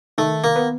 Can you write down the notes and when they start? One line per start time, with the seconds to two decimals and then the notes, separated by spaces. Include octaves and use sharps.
0.18 D#3 A3
0.44 A#3
0.56 B3